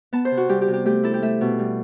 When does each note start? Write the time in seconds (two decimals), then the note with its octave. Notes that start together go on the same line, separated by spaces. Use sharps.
0.13 B3 A5
0.25 C5
0.31 C3
0.37 F#4
0.49 G3 G4
0.62 G4
0.68 C3
0.74 G4
0.86 A3 G4
1.04 E4 A4
1.14 G4
1.22 A3 E5
1.41 B2
1.59 G3